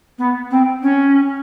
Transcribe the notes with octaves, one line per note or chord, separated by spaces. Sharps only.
B3
C4
C#4